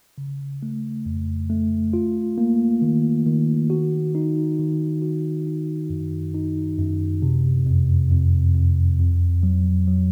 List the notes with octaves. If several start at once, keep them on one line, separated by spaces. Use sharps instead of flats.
C#3
A3
F2
A3
F4
A#3
D#3
D#3
F#4
D#4
D#3
F#4
D#4
F#2
D#4
F#2
C3
F2
F2
F2
F2
F#3
F#3